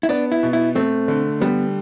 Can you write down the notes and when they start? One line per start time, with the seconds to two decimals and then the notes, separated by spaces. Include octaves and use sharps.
0.03 E4
0.09 B3 D4
0.32 E4
0.43 B2
0.53 E4
0.75 A3 C4
1.08 D3
1.41 G3 B3